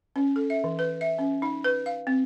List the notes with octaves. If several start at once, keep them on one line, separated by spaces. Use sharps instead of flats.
C#4
A4
E5
E3
B4
E5
C#4
D#4
B4
F5
C4